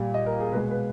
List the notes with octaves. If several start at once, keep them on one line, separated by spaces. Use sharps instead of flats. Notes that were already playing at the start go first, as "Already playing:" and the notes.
Already playing: A#2 G3
D#5
A#4
G#4
B2 G#3 B4
B4